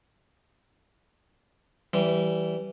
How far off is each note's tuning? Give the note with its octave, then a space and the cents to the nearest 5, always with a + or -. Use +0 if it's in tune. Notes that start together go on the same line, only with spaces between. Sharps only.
E3 +0 G3 -20